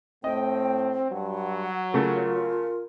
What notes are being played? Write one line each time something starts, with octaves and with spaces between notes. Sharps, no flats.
A2 C4 D#5 G5
G2 F#3 F#5
C#3 A3 F4 A#4